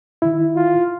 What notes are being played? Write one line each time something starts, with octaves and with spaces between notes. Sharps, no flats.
D#3 E4
F4